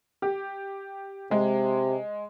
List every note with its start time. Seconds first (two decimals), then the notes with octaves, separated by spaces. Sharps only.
0.22 G4
1.31 C3 G#3